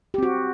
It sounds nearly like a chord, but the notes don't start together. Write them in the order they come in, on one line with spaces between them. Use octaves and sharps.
G4 C4 F#4